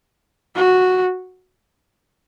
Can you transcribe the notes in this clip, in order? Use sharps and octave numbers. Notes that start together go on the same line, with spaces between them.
F#4